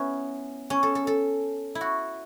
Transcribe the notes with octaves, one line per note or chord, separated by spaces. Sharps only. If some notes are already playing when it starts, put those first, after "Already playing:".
Already playing: B3 C#4 E4
C#4
A4
A4
A4
E4
F#4